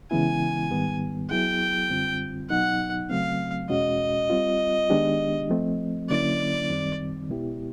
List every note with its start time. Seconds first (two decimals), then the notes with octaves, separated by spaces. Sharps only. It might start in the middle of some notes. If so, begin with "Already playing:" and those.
0.11 C#3 E3 G#3 B3 E4 G#5
0.70 G#2 D#3 G3 B3
1.30 F#3 B3 E4 G#4 G5
1.90 F#2 D3 G3 C4 F4
2.49 B2 F#3 B3 D#4 F#5
3.10 C#3 F#3 A3 C4 F5
3.70 E2 B2 G#3 C#4 F#4 D#5
4.30 G3 C4 F4
4.90 D#3 G#3 B3 D4 G4
5.49 F3 A3 C4
6.09 D3 F#3 A#3 C#4 E4 D5
6.69 F#2 D#3 G3 C4
7.29 B2 G#3 B3 E4 G4